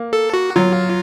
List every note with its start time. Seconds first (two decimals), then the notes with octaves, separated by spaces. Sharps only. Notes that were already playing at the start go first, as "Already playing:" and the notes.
Already playing: A#3
0.13 A4
0.34 F#4
0.56 F#3 F4